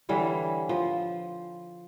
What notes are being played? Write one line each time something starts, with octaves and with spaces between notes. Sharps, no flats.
D3 E3 G3 C#5
F3